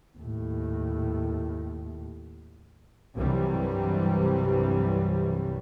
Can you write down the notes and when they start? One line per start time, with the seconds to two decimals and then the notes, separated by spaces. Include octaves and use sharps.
0.18 D#2 A2
3.17 C2 G2 C3 E3 F#3 G3